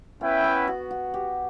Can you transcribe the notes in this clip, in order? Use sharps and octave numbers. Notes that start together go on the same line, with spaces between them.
B3 C#4 E4 B4 E5 G5
B3
F#4
F#4
G4